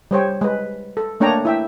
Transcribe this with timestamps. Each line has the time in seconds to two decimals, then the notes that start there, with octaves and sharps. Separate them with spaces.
0.11 G3 C5 C#5 G5
0.41 G#3 B4
0.97 A4
1.20 A3 A#3 D4 C#5 G5 A#5
1.45 E4 E5 G5